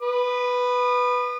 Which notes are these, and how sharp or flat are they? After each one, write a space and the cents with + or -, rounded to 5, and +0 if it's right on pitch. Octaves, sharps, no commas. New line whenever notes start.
B4 +0 D#6 -35